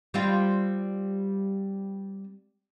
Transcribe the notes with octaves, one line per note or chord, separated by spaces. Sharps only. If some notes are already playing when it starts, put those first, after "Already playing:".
G3 C4 F4